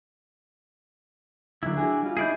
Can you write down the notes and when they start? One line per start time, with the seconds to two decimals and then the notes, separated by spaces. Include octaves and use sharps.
1.63 D2 F#3 D4 E4
1.77 F#4 G#4
2.02 G3 F4
2.17 D#4 E4 G#4 D5 G6